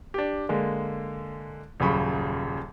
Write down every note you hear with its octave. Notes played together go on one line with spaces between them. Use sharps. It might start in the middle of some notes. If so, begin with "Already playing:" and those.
D4 G4
D3 G#3 A#3
D#1 F#2 C#3 B5 C#6